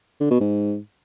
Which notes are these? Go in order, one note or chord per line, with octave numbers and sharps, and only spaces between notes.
D3
B2
G#2